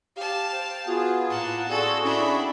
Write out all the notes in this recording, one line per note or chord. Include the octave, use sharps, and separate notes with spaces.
G4 F5 A5
C5 G5
B3 F4 F#4 G#4
A2 A#3 F#5 A5
C4 F#4 G#4 A4 D5
C#4 D4 E4 B5